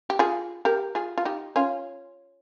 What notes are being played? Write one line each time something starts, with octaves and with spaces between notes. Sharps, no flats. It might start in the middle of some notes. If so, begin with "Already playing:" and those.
G4
F4 G#4
G4 A#4
F4 G#4
F4
D#4 G4
C#4 F4